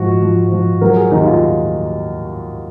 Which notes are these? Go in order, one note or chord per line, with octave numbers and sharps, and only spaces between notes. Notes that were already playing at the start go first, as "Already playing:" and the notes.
Already playing: G#2 F3 F#4
F3
F3
F#3 A#4
G#4
D#2 D#4
F4